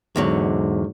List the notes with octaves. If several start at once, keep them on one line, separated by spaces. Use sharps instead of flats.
E2 G#2 D3 F#3